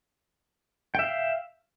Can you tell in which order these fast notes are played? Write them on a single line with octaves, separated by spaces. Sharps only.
G5 E5 F5